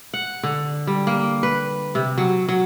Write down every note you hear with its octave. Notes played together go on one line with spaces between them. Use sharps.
F#5
D3
G3
A#3
B4
C3
F#3
F#3